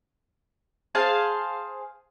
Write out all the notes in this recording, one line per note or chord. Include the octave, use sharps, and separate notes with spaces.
G#4 C5 F5 A5